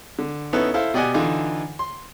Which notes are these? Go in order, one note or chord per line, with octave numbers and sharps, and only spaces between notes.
D3
B3 C#4 D#4 E4 A4 B4
E4 A4 C5 E5 F5
B2 G4 D5 D#5 F#5 G#5
D3 E3 D4 D#4 F4 D6
C6